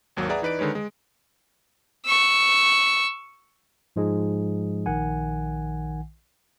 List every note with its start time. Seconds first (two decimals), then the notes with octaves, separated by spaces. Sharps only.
0.17 G#1 D#2 F#3 A#3
0.29 G#4 B4 D5 E5 F#5 A#5
0.42 E3 D#4 B4 D5 D7
0.59 D3 D#3 G#3 B4 C#5
0.75 G#3
2.06 C#6 E6
3.96 G#2 F3 G#3 D#4 G#4
4.86 A#1 D#3 F#5 G#5